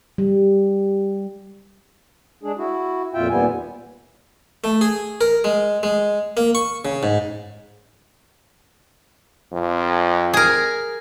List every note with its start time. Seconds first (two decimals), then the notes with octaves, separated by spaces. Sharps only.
0.18 G3
2.43 G#3 D4 G#4
2.58 E4 F#4
3.14 F2 A#2 F4 E5 G5
3.30 D#2 A#2 G3 B3 G#5
4.64 A3
4.81 G#4
5.21 A#4
5.44 G#3
5.83 G#3
6.37 A#3
6.55 C#6
6.85 C#3
7.03 G#2
9.53 F2
10.34 G#4 A#4